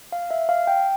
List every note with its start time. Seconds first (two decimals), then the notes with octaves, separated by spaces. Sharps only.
0.12 F5
0.31 E5
0.49 F5
0.67 G5